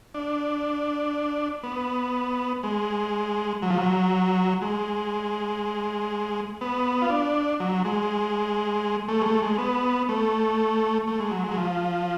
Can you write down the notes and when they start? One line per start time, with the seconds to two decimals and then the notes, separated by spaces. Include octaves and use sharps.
0.14 D4
1.63 B3
2.63 G#3
3.62 F#3
3.70 F3
3.78 F#3
4.62 G#3
6.61 B3
7.02 F4
7.10 D4
7.60 F#3
7.85 G#3
9.09 A3
9.22 G#3
9.26 A3
9.42 G#3
9.58 B3
10.09 A3
11.07 A3
11.20 G#3
11.31 F#3
11.44 G#3
11.51 F#3
11.58 F3